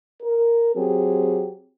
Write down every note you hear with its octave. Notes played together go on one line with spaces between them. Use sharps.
A#4
F#3 C4 G4 G#4